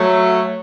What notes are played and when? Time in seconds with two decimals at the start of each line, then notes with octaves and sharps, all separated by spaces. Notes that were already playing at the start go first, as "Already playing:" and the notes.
Already playing: F#3 A3